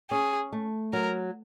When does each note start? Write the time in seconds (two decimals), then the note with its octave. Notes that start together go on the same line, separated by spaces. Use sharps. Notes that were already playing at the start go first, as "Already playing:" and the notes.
0.11 C#4 G#4
0.53 A3
0.93 F#3 A#4